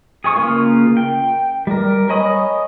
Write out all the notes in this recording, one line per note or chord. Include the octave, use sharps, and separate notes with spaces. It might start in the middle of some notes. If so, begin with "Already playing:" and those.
G#4 G#5 C#6 D#6
C#3 A#3 F4
G5
G3 A#4
C#5 D#5 G#5 B5 D#6